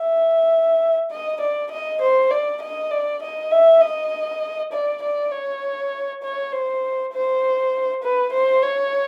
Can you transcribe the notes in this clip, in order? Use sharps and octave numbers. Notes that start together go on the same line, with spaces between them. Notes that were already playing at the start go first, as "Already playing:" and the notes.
Already playing: E5
D#5
D5
D#5
C5
D5
D#5
D5
D#5
E5
D#5
D5
D5
C#5
C#5
C5
C5
B4
C5
C#5